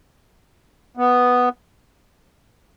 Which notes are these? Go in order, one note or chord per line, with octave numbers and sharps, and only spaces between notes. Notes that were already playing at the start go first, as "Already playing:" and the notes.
B3